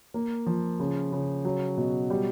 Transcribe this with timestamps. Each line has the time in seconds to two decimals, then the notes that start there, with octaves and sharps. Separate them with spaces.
0.14 A#3
0.46 F3
0.80 C#3
1.12 C#3
1.45 F#3
1.77 B2
2.10 G3